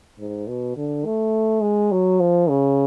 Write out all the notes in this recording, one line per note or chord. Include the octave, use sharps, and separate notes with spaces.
G#2
B2
D3
A3
G#3
F#3
F3
C#3